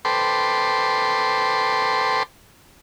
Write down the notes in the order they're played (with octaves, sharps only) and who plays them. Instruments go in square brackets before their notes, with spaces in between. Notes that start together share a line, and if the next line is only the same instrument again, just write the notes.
[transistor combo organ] A4 B4 C5 G5 C6 D6